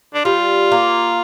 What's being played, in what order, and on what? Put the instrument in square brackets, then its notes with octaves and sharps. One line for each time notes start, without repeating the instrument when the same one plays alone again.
[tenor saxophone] D4
[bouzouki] G3 [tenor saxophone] F4
[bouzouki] A#3